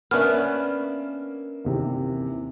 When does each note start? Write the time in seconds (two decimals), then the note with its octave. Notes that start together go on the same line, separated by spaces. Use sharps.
0.11 A#3 B3 C#4 D4 E5 F6
1.65 D#2 C3 E3